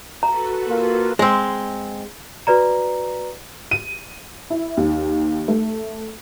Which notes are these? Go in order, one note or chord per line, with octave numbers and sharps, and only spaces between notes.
F#4 A4 B4 A#5
A#3 F4
G#3 C4
F#4 B4 D5 A#5
D#7
E4
D#2
A3